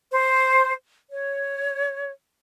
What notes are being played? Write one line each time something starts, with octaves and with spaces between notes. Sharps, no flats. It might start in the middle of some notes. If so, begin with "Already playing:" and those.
C5
C#5